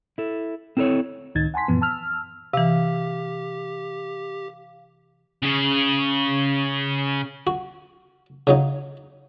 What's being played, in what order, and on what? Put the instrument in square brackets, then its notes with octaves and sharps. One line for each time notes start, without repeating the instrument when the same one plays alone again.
[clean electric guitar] E4 A4
C4 E4 A4 A#4 C#5
[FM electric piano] C#2 A2 D#3 D#4 G#6 A6
F#5 G#5 A5 C6 B6
F#2 A#2 E3 F3 B3
A5 E6 F6
[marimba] C3 E3 [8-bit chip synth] G4 [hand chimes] F5
[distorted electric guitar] C#3 G#4
[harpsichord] F#4
C#3 F#3 D#4